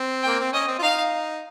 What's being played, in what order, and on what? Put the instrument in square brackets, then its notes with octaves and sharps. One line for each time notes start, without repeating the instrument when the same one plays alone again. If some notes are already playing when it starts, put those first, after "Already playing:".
Already playing: [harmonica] C4
[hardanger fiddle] G5
[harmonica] A#3
C4
[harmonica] C#4 [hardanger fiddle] D#5
[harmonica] C4
F4
[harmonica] D#4 [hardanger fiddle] F5